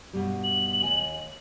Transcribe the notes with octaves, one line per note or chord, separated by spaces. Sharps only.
G2 B2 G3
F#7
D#2 D#5 G#5